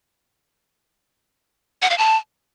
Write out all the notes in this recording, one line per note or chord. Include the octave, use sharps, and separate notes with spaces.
F#5
F5
A5